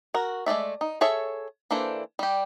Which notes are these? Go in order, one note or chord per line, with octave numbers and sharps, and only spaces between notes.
F#4 A#4
G#3 A3 D5 E5
D#4
G#4 A4 C#5 E5
E3 A#3 D4 A4 C5
G3 G4